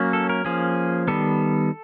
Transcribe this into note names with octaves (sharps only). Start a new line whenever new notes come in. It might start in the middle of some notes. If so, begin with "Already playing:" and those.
Already playing: F#3 A#3 C#4
A4
A#4
F3 A#3 C#4 G#4
D#3 G3 B3 A4